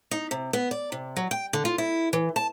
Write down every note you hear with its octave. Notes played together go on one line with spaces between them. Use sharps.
D#4
C3
B3
D5
C3
F#3
G5
D3
F4
E4
E3
A5